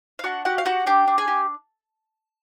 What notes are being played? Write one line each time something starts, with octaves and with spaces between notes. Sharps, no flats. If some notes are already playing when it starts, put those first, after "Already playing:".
F5
D4 F#4 F#5
F#4 G4 F#5
F5
F#4 G4 F#5
D4 G4 G5
D4
G#4 G#5
G4